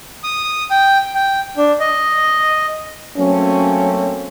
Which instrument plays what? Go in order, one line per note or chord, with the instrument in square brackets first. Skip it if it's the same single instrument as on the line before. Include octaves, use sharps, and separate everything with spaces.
[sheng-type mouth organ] D#6
G5
G5
D4
D#5
[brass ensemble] F#3 A3 A#3 C4 C#4